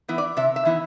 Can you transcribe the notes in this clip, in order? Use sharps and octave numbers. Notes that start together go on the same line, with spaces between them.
E3 B3 E4
D5
C3 E5
E5
E3 B3 E4